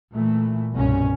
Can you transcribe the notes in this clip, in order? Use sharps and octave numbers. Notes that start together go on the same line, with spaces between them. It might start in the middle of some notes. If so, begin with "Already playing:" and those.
A#2 E3 A3
C2 G2 B2 C#4